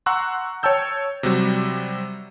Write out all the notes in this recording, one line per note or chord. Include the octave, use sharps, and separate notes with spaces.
F#5 A#5 C6 C#6 E6 F#6
C#5 G5 A5 E6 G6
C3 F#3 G3